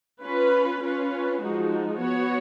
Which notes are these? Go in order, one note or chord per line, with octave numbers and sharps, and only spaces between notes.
C#4 F4 B4
C#4 F4 B4
F3 G#3 D#4 F#4
B3 F#4 C#5